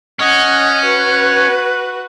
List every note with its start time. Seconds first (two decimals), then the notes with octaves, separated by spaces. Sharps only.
0.19 C#4 D#5 F#5
0.85 F#4 B4